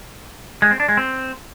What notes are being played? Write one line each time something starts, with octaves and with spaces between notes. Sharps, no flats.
G#3
C4
D4
G#3
C4